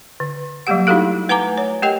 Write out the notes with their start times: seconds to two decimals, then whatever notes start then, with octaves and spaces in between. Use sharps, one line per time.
0.20 D3
0.67 F#3 G3 A3 A#3 G4 F#5
0.87 D#4 E4 F#4 G4 A4 F5
1.29 A3 B4 F#5 G#5 A#5 D6
1.58 C#5
1.83 A3 G4 A#4 D#5 G5